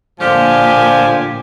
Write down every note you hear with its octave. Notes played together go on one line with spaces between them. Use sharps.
A#2 D3 F3 G4 G#5